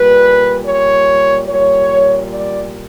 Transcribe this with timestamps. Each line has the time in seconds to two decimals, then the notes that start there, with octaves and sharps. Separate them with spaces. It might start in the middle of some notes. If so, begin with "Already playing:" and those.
Already playing: A#2 G3 B4
0.65 C#5
1.47 A#2 G3 C#5
2.28 D5